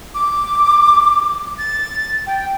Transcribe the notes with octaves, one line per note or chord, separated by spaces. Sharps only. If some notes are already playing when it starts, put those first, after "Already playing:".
D6
A6
G5